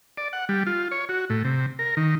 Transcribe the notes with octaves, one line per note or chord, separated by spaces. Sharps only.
D5
F#5
G3
F4
C#5
F#4
A2
C3
A#4
D#3